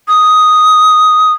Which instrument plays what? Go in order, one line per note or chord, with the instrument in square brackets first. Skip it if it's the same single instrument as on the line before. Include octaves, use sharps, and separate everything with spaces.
[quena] D#6